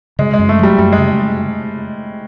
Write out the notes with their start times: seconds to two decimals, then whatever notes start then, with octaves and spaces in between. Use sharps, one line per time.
0.19 C#3 G#3
0.34 G#3
0.39 F#2
0.49 A3
0.59 F#3 G3
0.78 F#2 G3
0.93 G#3
0.98 C#3